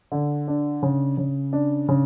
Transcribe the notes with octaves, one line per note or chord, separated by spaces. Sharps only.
D3
D4
C#3
C#3
D4
C#3